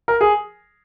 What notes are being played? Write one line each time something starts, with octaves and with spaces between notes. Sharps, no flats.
A#4
G#4